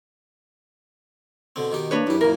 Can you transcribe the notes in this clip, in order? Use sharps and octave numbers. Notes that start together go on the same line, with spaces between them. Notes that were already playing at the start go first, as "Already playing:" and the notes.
B2 D3 C4
B2 D#3 G4
A#3 D4 B4 C#5
F#2 E4 G4
F#2 A#2 E3 A#4